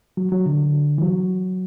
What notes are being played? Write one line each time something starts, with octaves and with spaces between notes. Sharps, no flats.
F#3
F#3
D3
E3
F#3